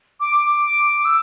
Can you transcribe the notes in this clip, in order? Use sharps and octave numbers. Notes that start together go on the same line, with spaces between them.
D6
E6